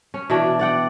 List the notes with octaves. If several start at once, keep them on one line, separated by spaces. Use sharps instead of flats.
C#4
B2 E3 D4
D5 F#5 G5